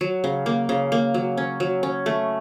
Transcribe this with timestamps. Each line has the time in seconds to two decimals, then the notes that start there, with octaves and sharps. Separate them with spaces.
0.01 F#3
0.24 C#3
0.46 A#3
0.69 C#3
0.92 A#3
1.14 F#3
1.37 C#4
1.60 F#3
1.83 C#4
2.06 A3